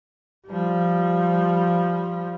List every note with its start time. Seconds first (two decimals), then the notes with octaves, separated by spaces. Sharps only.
0.47 F3 G3